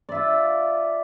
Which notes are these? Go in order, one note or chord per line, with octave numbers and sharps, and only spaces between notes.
F4 D5 E5